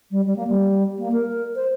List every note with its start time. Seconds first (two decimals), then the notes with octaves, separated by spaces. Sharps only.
0.11 G3
0.26 G3
0.36 A#3
0.47 G3
0.98 A#3
1.12 A#4
1.56 C5